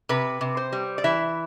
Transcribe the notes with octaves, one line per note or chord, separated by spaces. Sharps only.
C3 B4
C3
C5
G3
D5
E3 E5